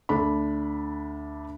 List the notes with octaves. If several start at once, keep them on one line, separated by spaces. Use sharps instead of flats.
D2 D4 A4 B5